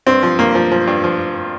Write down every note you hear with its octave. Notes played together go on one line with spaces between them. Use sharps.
G2 C4
F3
G2 A#3
F3
F3
G2
F3